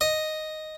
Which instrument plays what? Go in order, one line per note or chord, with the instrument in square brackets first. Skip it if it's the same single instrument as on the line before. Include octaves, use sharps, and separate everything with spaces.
[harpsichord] D#5